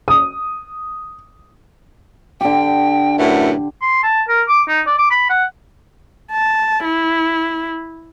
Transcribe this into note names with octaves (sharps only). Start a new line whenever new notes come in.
D#6
D3 G4 G5
F#2 A2 E3 F#5
C6
A5
A#4
D6
D#4
D5
D6
B5
F#5
A5
E4